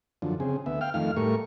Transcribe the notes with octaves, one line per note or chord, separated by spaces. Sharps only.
F#2 D3 F3
C#3 C4 G#4
D2 B3 E5
F5 G5 F6
F2 D#3 A3 F5 F6
A2 G3 A3 A#4 C#6